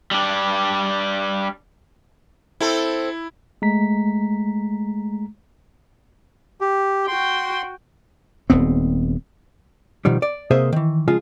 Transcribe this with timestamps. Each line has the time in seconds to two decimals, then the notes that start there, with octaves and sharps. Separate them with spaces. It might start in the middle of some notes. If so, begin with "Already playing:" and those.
0.11 G3 D4
2.61 C4 E4 A4
3.62 G#3 A3 A#5 B6
6.61 G4
7.07 F#4 G5 C6
8.50 D#1 D#2 B3 C4
10.05 B2 D#3 F3 G3
10.22 D5
10.51 C3 A#3 G#4 C5 D#5 E5
10.73 D#3 E3
11.08 C#3 F3 G#3 F4 G#4